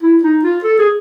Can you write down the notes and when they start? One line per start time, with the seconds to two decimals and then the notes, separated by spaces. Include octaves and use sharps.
0.02 E4
0.23 D#4
0.44 F4
0.64 A4
0.79 G#4